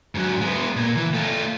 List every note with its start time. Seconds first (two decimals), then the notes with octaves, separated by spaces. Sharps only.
0.15 G#2 F#3
0.42 G#3 B3
0.76 A#2
0.96 E3
1.14 A3 F4